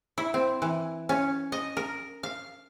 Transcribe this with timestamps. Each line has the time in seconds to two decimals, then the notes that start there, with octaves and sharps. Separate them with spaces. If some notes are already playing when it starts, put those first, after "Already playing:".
0.18 E4
0.34 C4
0.62 E3
1.09 C#4
1.52 D#5
1.77 A#4
2.23 F5